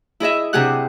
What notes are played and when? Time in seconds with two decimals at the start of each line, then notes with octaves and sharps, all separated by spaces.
0.20 E4 G#4 D#5 E5
0.53 C3 D4 G4 G#4 F#5 F#6